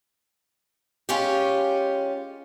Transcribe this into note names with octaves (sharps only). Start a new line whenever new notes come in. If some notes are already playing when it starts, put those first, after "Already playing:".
G#3 C#4 F4 G4